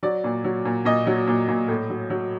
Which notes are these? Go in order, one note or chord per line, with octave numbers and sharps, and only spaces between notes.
F#3 D5
A#2
F#3
A#2
A#2 D#5
F#3
A#2
A#2
A2
F#3
F#3